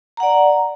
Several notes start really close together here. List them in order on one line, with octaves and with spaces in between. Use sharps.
A#5 F#5 D5